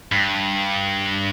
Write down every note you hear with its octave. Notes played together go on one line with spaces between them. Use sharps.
G2